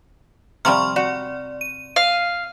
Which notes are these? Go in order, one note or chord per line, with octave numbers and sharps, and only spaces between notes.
C3 F3 G3 C6 C#6 F6
F#4 D5
D#7
F5